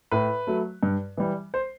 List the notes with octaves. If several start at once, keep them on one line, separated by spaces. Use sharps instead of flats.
A2 B4
F#3 A3
G2
E3 G3
C5